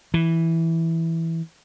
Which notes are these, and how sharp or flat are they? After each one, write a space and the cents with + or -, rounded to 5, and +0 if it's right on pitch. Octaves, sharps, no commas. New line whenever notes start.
E3 -5